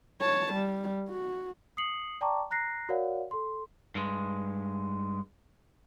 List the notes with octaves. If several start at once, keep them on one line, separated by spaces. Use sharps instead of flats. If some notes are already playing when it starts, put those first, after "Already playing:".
C#5 A5
G3
F#4
D#6 C7 C#7 F#7
D5 G5 A5 A#5 C#6 D6
A#5 F#6 A#6 C7
F#4 A#4 C#5 D5 F5 F#5
A4 C6
G2 G#3